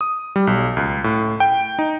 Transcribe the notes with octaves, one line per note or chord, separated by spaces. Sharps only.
D#6
G3
B1
C#2
A2
G5
D#4